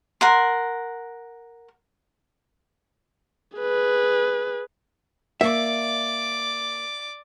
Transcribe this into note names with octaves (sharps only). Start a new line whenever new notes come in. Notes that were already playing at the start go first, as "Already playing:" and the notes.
A#4 F#5 C6
G#4 B4
A#3 D5 E5 D6